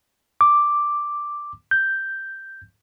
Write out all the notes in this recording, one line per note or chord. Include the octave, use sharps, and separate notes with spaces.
D6
G6